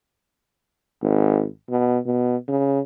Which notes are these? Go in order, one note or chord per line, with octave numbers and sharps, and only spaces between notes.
G#1
B2
B2
C#3